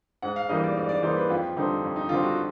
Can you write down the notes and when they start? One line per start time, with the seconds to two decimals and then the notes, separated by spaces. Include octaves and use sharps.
0.22 G#2 F#5
0.36 F5
0.49 E3 G3 A#3 D#4 D#5
0.63 D5
0.77 G#2 D5
0.89 D5
1.02 E3 G3 A#3 D#4 C5
1.16 B4
1.29 F2 F4
1.57 D3 G3 C4 D#4
1.82 F2
1.96 D#4
2.09 D3 G3 C4 F4
2.23 F#4